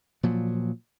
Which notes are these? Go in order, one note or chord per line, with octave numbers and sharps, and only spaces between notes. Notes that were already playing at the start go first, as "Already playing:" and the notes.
A#2 F3 F#3